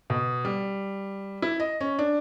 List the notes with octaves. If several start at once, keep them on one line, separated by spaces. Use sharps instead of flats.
B2
G3
E4
D#5
C#4
D4